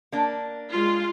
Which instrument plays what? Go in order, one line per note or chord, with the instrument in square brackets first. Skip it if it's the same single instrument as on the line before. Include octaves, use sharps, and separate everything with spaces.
[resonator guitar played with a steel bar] A#3 D4
[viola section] G#3 F4 F5